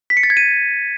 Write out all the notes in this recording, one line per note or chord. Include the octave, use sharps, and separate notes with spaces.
B6
C#7
A6
G#6
D#7